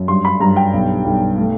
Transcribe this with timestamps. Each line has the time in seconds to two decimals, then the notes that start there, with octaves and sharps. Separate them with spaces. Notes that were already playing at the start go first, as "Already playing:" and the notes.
Already playing: F#2
0.08 G2 C6
0.25 B5
0.40 G2 A#5
0.56 G5
0.74 B1
1.05 B1
1.38 A3